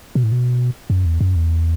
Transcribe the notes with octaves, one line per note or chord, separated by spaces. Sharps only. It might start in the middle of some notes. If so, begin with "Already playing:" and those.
B2
A2
B2
F#2
E2
F#2
E2